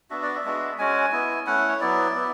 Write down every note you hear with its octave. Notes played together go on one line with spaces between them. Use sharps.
B3 D4 F#4 E5
D5
E5
G#3 B3 D4 F#4
G#3 C#4 F#4 G#5
B3 E4
A3 C#4 E4 F#5
C#5
F#3 B3 E4 D5
B3 E4